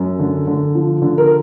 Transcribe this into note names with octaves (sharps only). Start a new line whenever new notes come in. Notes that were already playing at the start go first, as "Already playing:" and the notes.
Already playing: F#2
D3
D3
F3
D3
A#4